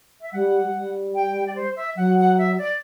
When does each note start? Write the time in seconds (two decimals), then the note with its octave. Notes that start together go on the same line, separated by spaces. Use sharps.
0.22 E5
0.33 G3 F#5
0.74 G3
1.15 G5
1.45 D5
1.55 C5
1.76 E5
1.96 F#3 F#5
2.17 F#5
2.38 E5
2.57 D5